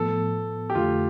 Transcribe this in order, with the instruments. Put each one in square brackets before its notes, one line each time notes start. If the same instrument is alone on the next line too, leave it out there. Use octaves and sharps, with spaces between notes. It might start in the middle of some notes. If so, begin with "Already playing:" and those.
Already playing: [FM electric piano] A2 F3 B3 [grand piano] A4
[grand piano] G4
[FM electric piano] F2 D3 A3 [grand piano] F4